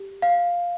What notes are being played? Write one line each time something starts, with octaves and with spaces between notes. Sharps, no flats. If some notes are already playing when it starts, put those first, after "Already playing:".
Already playing: G4
F5